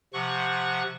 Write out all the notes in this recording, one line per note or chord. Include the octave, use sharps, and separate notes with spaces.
C3 F3 F#5 C#6 F#6